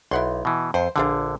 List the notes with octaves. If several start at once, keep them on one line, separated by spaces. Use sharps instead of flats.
B1 E4 F#5 C6
B2 E3
F2 C5
A#1 D3 D4 F4 G#4